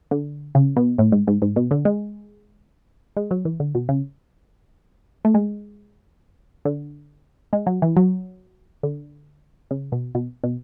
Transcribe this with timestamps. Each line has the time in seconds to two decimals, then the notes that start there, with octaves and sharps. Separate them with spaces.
0.11 D3
0.55 C#3
0.76 B2
0.98 A2
1.12 G#2
1.28 G#2
1.42 G#2
1.56 B2
1.71 D3
1.85 G#3
3.17 G#3
3.31 F#3
3.45 E3
3.60 D3
3.75 B2
3.89 C#3
5.25 A3
5.34 G#3
6.65 D3
7.53 G#3
7.66 F#3
7.82 E3
7.96 F#3
8.83 D3
9.71 C#3
9.92 B2
10.15 B2
10.44 B2